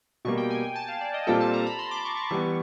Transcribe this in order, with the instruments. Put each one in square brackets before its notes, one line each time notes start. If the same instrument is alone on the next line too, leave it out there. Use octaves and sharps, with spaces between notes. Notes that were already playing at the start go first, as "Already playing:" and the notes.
[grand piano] B2 G3 A#3 [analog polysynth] C#6
[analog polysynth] G5
G#5
G#5
A5
F5
D5
D#5
[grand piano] A#2 G3 C4 F4 A4 [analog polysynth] G5
[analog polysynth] A5
A#5
B5
C6
D6
C#6
C#6
[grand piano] E3 G3 B3 [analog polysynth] C#6